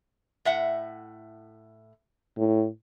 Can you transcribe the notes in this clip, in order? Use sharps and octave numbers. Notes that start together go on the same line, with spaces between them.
A2 E5 F#5
A2